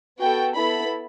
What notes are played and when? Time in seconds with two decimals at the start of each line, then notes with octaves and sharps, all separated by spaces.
0.20 B3 F#4 A4 G5
0.57 B3 E4 A4 B5